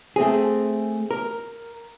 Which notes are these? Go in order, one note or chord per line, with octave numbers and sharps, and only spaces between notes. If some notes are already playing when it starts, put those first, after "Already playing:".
A3 C4 G#4
A#4